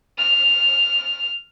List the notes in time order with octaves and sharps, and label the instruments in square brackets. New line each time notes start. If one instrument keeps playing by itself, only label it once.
[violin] F6